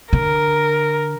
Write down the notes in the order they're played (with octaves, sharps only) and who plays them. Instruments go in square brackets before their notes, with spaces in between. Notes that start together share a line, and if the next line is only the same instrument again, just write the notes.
[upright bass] D3 [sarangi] A#4